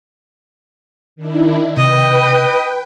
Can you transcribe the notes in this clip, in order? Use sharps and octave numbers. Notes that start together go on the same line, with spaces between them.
D#3 D4 E4
C3 B4 D#5 G5